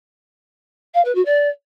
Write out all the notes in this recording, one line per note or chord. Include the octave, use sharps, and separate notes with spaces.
F5
B4
F#4
D5